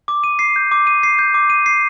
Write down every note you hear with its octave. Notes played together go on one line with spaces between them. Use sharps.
D6
D#7
C7
G6
D6
D#7
C7
G6
D6
D#7
C7